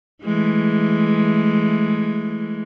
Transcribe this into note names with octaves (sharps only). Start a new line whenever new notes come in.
E3 G#3 A3